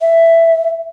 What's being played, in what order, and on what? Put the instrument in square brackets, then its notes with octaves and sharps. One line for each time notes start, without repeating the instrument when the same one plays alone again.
[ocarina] E5